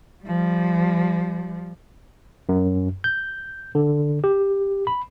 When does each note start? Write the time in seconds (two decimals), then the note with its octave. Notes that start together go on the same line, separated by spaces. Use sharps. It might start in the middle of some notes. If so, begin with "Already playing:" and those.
0.25 F3 G3
2.49 F#2
3.04 G6
3.75 D3
4.24 G4
4.87 B5